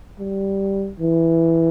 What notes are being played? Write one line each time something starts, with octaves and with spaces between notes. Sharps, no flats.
G3
E3